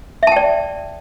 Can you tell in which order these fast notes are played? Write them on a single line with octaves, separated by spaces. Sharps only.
E5 A5 G5 D5